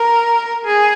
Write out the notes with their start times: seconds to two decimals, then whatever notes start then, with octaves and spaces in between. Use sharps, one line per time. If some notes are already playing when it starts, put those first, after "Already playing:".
Already playing: A#4
0.65 G#4